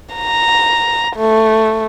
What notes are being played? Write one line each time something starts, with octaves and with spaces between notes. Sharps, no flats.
A#5
A3